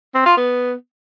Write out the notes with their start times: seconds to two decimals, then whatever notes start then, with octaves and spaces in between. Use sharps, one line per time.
0.14 C4
0.26 F4
0.37 B3